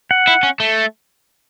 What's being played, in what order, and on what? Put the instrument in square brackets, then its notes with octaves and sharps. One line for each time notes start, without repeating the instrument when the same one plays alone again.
[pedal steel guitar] F#5
[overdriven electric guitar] E4
C#4
A3